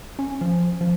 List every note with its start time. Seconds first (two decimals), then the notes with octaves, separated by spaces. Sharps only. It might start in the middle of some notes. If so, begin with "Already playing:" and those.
0.19 C#4
0.41 F3
0.81 F3